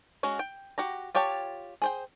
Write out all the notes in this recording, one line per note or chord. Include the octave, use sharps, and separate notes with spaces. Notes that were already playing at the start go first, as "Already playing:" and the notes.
G#3 C#4 F#4
G5
F#4 G4 A#5
F4 G4 C#5 G5 A5
G#4 C5 G5